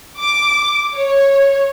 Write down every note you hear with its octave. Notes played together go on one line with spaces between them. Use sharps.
D6
C#5